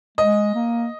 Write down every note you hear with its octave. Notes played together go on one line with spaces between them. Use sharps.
G#3 D#5
A#3